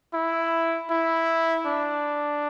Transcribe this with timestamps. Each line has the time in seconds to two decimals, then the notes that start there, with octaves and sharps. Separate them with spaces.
0.14 E4
0.90 E4
1.67 D4